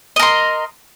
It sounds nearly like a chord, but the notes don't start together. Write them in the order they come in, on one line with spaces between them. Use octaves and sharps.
D#5 A#4 C6